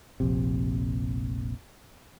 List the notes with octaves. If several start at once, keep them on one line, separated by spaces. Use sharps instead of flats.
F1 A#1 C3